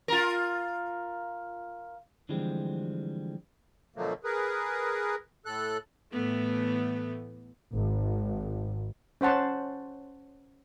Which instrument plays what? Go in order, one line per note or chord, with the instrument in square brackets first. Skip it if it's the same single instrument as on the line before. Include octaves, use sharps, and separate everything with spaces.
[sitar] F4 A#4
[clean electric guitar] D3 E3 F3 G3 G#3 C4
[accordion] B2 D3 F3 F#3 A3 A#3
G#4 A#4 B4
A2 A4 F#6
[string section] A2 E3 A3 B3
G#1
[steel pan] C#4 C5 F#5 A5 C6